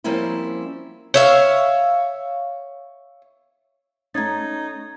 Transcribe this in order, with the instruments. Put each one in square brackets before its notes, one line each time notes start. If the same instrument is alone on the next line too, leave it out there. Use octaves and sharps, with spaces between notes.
[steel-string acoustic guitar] F3 G3 A#3 C4 C#4 E4
[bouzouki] C#5 E5 F5
[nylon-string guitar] A3 C#4 [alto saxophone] D#4 [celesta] A#5 G#6 A6